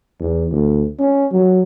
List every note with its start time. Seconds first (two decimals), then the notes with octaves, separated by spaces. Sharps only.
0.20 E2
0.51 D2
0.99 C#4
1.32 F#3